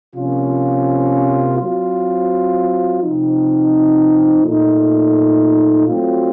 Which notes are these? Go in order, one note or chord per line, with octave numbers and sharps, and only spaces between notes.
C3 F3 A#3 C#4 F4
F#3 C4 F4
C3 F3 C4 D#4
A#2 A3 D#4
F#3 A3 C4 F4